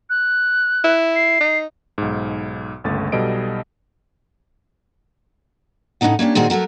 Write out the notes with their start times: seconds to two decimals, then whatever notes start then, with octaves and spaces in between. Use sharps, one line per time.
0.10 F#6
0.84 E4
1.16 C7
1.41 D#4
1.98 B1 G#2
2.84 G1 C#2 A3 A6
3.12 B1 B2 G3 A4 D#5 D7
6.01 A2 C#3 E3 D4 D#4 F#5
6.19 A#3 C#4 D4 G4
6.35 A#2 D#3 C4 F#4 G#4
6.50 F#3 A3 F#4 A#4